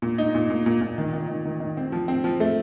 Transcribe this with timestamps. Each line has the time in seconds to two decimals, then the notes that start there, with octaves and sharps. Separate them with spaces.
0.02 A#2
0.18 D#4
0.35 A#2
0.50 A#2
0.66 A#2
0.81 A#2
0.98 D#3
1.13 D#3
1.28 D#3
1.45 D#3
1.60 D#3
1.77 C4
1.92 F3
2.08 C4
2.24 F3
2.40 A3